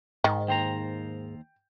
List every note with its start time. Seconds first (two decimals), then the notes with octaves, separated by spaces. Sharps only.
0.24 G#2 D#3
0.48 D#2 C5 G5 A#5